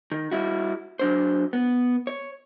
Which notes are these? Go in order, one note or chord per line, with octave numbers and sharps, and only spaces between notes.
D#3
G3 E4 F#4
F#3 D4 C5
B3
C#5